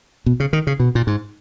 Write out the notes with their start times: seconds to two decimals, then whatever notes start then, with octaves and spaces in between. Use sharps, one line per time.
0.26 B2
0.40 C#3
0.53 D#3
0.67 C#3
0.80 B2
0.95 A#2
1.07 G#2